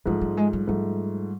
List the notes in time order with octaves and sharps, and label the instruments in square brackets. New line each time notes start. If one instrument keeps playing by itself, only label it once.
[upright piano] G#2 F3 A3 [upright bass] G#3
[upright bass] G3
G#3
G3
[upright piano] G#2 F3 A3 [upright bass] G3